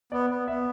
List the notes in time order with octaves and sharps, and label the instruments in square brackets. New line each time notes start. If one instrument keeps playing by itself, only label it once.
[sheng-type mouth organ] B3 [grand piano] D5
[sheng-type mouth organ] B3
[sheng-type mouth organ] B3 [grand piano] E5